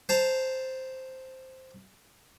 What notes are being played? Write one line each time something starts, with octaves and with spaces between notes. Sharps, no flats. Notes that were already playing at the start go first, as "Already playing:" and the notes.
C5 A5 A#5